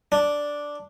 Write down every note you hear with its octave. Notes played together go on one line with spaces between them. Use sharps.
D4